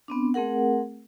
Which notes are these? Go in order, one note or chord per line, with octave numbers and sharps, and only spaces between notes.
B3 C4 D4
A3 C4 G#4 A#4 F#5